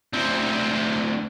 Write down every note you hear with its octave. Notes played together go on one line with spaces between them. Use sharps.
D2 C4